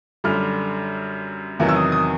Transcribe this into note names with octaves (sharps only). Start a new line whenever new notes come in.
F#2 D3 G3 F6
E2 C3 D#3 F#3
E6
D#6
D#6